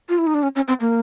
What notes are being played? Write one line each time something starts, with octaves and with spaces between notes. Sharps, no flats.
F4
E4
D#4
D4
C#4
C#4
C4
A#3